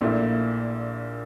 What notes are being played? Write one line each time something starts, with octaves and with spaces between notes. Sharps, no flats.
A#1 A#2 A3 E4